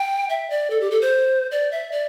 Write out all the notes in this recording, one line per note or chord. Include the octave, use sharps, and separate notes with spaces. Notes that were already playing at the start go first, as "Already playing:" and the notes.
Already playing: G5
E5
D5
A4
G4
A4
C5
D5
E5
D5